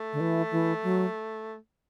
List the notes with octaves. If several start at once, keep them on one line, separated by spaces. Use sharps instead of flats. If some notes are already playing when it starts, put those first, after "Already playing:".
Already playing: A3
D3
E3
E3
F#3